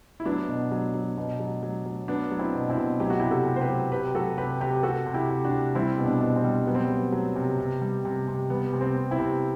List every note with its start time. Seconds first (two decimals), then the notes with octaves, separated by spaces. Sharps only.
0.20 E4
0.25 F#3 B3 D4
0.48 B2
0.71 F#3
0.94 F#3
1.17 B2
1.40 F#3
1.63 F#3
1.86 F#3
2.08 F#3 B3 D4
2.31 F#3
2.39 C4 E4
2.55 B2
2.70 C4 E4
2.77 B2
3.00 F#3 G4
3.10 F#4
3.19 C3 E4 G4
3.31 F#4 A4
3.46 C3
3.56 C5
3.61 G4 B4
3.69 F#3
3.92 C3 G4 B4
4.15 F#3 F#4 A4
4.38 C3 G4 B4
4.60 C3 G4 B4
4.83 C3 F#4 A4
5.06 C3
5.14 E4 G4
5.29 C3
5.44 D4 F#4
5.52 C3
5.75 G3 C4 E4
5.98 B2
6.06 B3 D4
6.21 B2
6.36 C4
6.44 G3
6.67 F#3 B3
6.75 C4
6.83 B3
6.90 F#3
7.12 F#3
7.36 C3
7.58 C3
7.81 G3
8.05 C3
8.28 C3
8.50 G3 B3
8.73 C3
8.81 C4
8.96 C3
9.11 C4 E4
9.19 C3